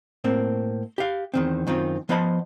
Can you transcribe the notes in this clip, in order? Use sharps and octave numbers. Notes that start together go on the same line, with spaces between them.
A2 A#3 C4
G4 F5
E2 D#3 C4
F#2 D#3 C4 F4
F3 B3 C5 D#5 A5 B5